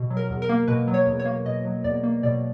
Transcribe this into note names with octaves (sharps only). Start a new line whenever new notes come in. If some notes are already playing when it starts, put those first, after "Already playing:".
Already playing: B2
F#3
A#4
E2
A#4
A#3
B2 B4
F#3
C#5
E2
C#5
A#3
B2 D#5
F#3
E2 D5
A#3
B2 D5